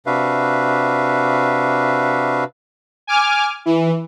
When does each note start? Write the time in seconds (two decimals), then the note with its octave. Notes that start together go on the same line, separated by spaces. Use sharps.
0.06 C3 D4 F#4 B4 E5 F5
3.07 G#5 D6 F6
3.66 E3